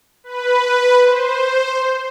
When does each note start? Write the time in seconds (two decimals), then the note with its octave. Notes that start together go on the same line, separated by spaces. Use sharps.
0.24 B4
1.03 C5